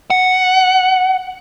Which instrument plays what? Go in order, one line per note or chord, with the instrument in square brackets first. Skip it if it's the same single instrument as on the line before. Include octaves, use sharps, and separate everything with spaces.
[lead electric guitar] F#5